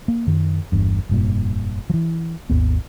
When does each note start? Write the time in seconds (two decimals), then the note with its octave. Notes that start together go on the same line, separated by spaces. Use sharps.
0.08 A#3
0.27 F#2 D#3
0.72 G1 E2 G2
1.09 F1 G2 A#2
1.90 E3 F3
2.50 G#1 D#2 B3